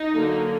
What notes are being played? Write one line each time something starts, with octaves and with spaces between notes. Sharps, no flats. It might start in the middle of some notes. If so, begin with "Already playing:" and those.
Already playing: D#4
D3 F#3 A#3